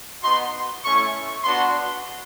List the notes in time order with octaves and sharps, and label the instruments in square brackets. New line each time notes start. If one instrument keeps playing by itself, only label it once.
[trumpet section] B3 D#4 F#4 C6
A3 C#4 E4 C#6
B3 D4 F#4 C6